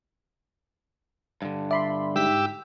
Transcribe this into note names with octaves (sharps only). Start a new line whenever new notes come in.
G2 D3
D5 E5 B5 C6
G#2 G4 E6 B6